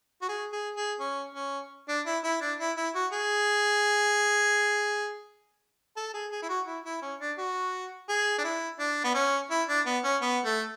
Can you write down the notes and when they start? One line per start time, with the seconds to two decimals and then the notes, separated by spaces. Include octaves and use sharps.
0.22 F#4
0.29 G#4
0.53 G#4
0.76 G#4
1.00 C#4
1.35 C#4
1.88 D4
2.06 E4
2.24 E4
2.41 D4
2.59 E4
2.77 E4
2.95 F#4
3.12 G#4
5.96 A4
6.14 G#4
6.32 G#4
6.42 E4
6.49 F#4
6.67 E4
6.85 E4
7.02 C#4
7.20 D4
7.38 F#4
8.09 G#4
8.38 D4
8.44 E4
8.79 D4
9.04 B3
9.15 C#4
9.51 E4
9.68 D4
9.86 B3
10.04 C#4
10.22 B3
10.45 A3